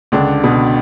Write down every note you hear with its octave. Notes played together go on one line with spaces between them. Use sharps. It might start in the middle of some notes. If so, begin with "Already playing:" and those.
C#2 D3 D4
B2